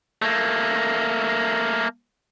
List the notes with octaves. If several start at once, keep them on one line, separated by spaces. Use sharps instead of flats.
A3 A#3